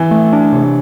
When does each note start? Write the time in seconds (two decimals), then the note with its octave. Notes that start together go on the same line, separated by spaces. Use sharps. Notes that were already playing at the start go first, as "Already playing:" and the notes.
Already playing: E3
0.11 A3
0.33 D4
0.53 C3